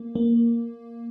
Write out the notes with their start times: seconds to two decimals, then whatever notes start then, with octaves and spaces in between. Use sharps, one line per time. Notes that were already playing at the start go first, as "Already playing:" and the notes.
Already playing: A#3
0.15 A#3